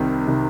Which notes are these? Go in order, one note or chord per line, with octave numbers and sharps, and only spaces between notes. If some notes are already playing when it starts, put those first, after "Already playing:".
Already playing: C2 C3 D#3
C3 D#3